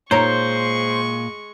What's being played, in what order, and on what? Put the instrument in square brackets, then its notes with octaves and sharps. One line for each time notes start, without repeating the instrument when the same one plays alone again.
[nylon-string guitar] A#2 [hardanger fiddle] G#3 C#6 [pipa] D#4 A#4 C#5 [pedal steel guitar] C5